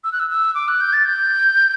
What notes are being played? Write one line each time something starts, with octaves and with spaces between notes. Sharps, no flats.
E6
F#6
E6
E6
D6
F#6
G6
A6
G6